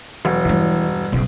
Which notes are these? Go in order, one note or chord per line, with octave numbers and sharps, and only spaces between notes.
E1 F#3
G2 E3 G3
F1 B1 C#3